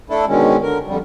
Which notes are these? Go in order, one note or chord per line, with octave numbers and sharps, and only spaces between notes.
A3 D4 E4 A4
B2 D3 D#3 G#3 C#4
D3 A#4
F2 D3 G3